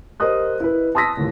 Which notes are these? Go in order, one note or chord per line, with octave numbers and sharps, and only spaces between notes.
G4 A#4 C5 D#5 D#6 F#6
E4 B4
A5 C6 D#6 E6 A#6 B6
D#1 D#2 A2